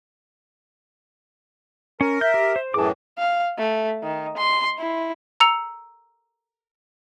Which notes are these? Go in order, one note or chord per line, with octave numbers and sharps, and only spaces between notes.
C#4 A#4
E5 G6
G4
C5
F#2 A2 E3 G#4 A5 D6
F5
A3
D#3
C6
E4
A#5 E6 C#7 F7